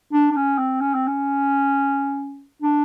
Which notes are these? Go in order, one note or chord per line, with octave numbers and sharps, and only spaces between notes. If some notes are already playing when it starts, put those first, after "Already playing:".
D4
D4
C#4
C4
C#4
C4
C#4
D4